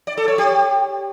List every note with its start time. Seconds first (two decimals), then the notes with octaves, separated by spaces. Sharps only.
0.07 D5
0.17 A4
0.28 C#5
0.38 G4